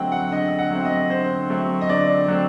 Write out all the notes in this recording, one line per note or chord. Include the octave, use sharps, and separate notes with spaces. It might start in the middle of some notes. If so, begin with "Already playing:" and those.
Already playing: D3 F#3 A3 C4 D#5 F#5 G5
F#5
D3 D#5
F#5
F#3 A3 C4
D#5
D3 C5
F#3 A3 C4
D#5
D3 D5
F#3 A3 C4